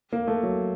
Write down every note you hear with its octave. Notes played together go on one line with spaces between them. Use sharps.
A#3
A3
F#3